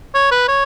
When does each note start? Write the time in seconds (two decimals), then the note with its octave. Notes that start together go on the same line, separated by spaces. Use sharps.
0.14 C#5
0.31 B4
0.48 C#5